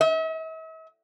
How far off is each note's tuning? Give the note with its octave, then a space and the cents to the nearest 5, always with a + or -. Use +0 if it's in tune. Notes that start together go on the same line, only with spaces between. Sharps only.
E5 -45